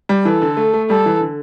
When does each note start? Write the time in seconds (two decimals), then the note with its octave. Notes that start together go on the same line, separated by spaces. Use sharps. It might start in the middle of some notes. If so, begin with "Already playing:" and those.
0.09 G3
0.25 E3 A4
0.42 D3
0.57 A3
0.73 A3
0.89 G3 A4
1.06 E3
1.21 D3